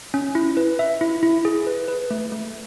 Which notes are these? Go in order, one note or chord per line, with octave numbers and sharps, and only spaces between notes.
C#4
E4
B4
E5
E4
E4
G#4
B4
B4
A3
A3